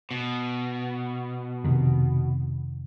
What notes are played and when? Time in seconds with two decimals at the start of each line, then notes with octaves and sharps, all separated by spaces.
0.11 B2
1.64 F2 C3 D#3